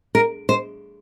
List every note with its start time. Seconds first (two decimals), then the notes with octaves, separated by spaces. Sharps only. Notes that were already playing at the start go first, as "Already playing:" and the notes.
0.15 A#4
0.49 C5